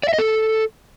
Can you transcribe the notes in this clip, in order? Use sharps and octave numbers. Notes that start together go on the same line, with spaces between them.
D5
E5
D#5
A4